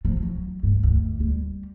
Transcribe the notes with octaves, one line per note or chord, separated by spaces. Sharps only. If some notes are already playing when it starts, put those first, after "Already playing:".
F3
F#3
G2
D2
G3